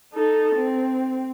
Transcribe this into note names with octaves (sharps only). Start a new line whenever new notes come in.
D#4 A4
C4